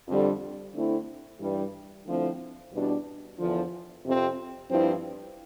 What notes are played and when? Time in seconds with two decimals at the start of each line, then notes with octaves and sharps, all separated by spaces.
0.08 F2 D3 G3
0.74 D3 A3 C4 E4
1.40 G2 E3 G3
2.06 D3 F3 A3 C4 E4
2.72 E2 B2 G3 D4
3.38 E2 D3 F3
4.04 F2 C3 F3 C4
4.70 G2 F3 C4 E4